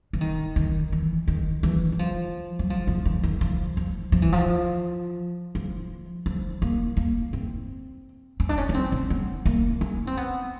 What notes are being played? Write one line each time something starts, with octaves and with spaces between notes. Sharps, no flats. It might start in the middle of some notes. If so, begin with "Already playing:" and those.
E3
D#3
D#3
E3
D#3
E3
F#3
F3
F#3
F3
F3
E3
D#3
F3
F3
F3
E3
F3
F3
F3
A#3
A#3
C4
C#4
D4
C#4
C#4
C4
C#4
B3
A#3
C#4
C4
B3